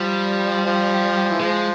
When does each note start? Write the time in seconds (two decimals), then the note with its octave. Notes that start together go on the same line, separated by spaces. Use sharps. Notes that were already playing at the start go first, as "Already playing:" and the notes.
Already playing: F3 G3
0.66 F3
1.31 E3
1.40 F3 G#3